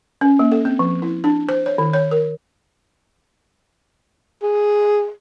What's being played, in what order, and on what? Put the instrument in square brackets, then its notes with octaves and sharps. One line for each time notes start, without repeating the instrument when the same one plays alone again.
[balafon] C#4
A#3
A4
C4
F3
E4
D4
C5
C#5
D#3
C#5
A#4
[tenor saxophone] G#4